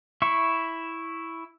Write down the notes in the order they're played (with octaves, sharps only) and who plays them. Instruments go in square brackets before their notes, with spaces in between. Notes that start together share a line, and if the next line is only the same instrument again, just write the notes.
[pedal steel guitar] E4 E5 C#6